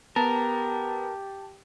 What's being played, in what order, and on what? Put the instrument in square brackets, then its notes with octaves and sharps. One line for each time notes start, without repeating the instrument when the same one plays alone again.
[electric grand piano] B3 [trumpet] G4 [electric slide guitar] A#4 [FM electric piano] A5